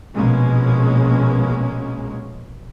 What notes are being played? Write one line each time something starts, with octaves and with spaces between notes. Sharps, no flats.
A#1 B2 G#3 A#3 C#4